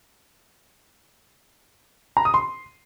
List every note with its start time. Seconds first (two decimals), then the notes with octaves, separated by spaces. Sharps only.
2.17 A#5
2.25 D#6
2.34 C6